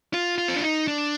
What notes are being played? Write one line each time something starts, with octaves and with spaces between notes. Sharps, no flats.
F4
F4
C4
D4
D#4
D4